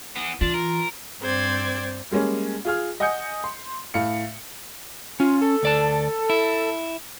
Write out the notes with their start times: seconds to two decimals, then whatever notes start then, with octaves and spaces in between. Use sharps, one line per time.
0.16 E3 B3
0.41 E3 D4 F4
0.54 A#4
1.20 G2 C4 C5 D5 G#6
2.11 G3 G#3 A#3 C#4
2.65 F4 G#4 F6
3.00 D#5 F#5 G#5 D#6 G6 C#7
3.44 C6
3.94 A2 F5 C#7
5.20 C#4 F4
5.41 A4
5.63 D2 D5 A5
6.30 E4